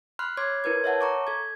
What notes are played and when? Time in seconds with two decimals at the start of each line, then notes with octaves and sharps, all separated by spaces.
0.19 B5 C6 F6 F#6
0.37 C#5 C6 D6 G#6
0.64 E4 A#4 B4 G#6
0.84 C#5 E5 F#5 A5
1.01 A#5 C#6 D6
1.27 A4 G#6